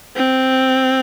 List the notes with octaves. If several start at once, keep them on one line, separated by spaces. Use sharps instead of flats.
C4